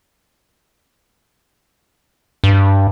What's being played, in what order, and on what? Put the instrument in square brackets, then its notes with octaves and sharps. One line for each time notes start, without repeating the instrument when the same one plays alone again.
[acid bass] G2